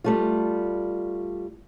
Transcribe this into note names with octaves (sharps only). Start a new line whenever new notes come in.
G3 A3 F4